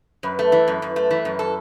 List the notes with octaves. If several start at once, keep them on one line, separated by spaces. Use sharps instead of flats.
F#2 B4
A3
E3
F#2
F#2
A3
E3
F#2
A4